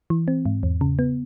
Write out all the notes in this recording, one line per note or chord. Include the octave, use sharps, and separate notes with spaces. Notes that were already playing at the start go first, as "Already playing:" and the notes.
E3
C4
G#2
E2
C#3
B3